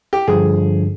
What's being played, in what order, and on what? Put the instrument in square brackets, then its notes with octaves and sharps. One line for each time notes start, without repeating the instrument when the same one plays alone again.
[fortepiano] G4
[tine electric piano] G2 D3 F3 [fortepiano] G#4